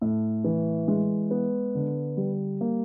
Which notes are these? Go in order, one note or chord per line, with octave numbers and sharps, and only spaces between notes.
A2
E3
G#3
B3
D3
G3
A#3